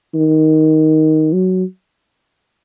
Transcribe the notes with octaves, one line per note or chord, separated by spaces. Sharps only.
D#3
F#3